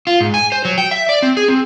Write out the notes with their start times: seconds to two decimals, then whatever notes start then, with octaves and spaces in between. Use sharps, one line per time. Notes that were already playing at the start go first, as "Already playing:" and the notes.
0.07 F4
0.21 G#2
0.34 G#5
0.52 C5
0.65 F#3
0.78 G5
0.91 E5
1.09 D5
1.22 C4
1.37 G#4
1.48 C4